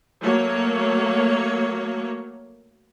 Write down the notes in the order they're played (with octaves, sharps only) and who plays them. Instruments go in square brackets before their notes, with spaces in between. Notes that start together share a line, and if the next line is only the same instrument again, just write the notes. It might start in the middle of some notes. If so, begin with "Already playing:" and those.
[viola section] F#3 A3 A#3 C#5